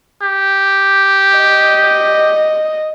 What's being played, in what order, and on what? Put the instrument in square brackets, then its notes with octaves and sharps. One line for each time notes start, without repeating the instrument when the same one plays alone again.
[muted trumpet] G4
[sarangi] D#5